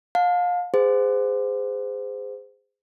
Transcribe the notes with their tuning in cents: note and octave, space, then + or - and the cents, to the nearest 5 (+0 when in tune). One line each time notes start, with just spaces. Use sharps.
F5 +30 A5 +0
G#4 -20 C5 -25 F#5 -40